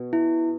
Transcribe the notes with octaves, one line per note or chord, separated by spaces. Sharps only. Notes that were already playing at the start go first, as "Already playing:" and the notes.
Already playing: B2
E4